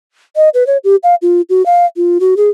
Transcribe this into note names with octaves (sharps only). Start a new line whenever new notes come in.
D#5
B4
C#5
G4
F5
F4
F#4
F5
F4
F#4
G#4